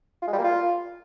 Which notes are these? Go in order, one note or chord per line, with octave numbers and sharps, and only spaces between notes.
F4
G#3
G3
A#3
F4